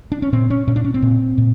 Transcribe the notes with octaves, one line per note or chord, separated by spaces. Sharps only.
D4
C#4
A#2 C4
C#4
A#2 C#4
D4
C#4
C4
A#2
A#2